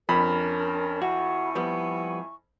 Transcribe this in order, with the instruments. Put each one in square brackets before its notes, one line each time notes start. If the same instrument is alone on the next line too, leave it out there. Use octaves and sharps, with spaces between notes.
[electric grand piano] F2 [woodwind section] C#4 D4 A#4 [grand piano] B5
[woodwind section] E4 G#5 C#6 [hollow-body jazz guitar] F#4
[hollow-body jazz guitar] F3 G3 B3